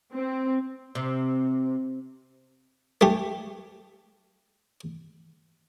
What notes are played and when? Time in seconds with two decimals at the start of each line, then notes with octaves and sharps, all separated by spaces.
0.12 C4
0.95 C3
3.01 A3 G4